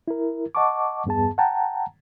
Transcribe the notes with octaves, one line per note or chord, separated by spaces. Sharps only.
E4 A#4
D#5 F#5 A5 C#6 D6
E2 G2 B3 G#4 A5
F#5 G5 A5 A#5